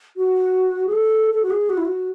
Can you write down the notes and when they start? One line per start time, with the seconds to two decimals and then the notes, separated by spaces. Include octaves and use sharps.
0.17 F#4
0.87 G#4
0.92 A4
1.31 A4
1.43 F#4
1.50 G#4
1.70 F#4
1.77 E4
1.85 F#4